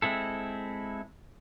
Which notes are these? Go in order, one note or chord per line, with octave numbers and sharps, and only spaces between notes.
G#3 C4 E4 A4